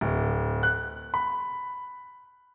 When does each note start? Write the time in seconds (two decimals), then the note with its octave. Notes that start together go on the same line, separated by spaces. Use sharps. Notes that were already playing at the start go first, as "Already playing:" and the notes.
0.01 D1
0.63 F#6
1.14 B5